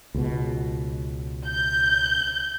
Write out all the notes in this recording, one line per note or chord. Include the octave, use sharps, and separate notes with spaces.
C#2 B2
G6